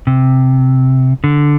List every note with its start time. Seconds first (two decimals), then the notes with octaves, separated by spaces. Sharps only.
0.07 C3
1.24 D3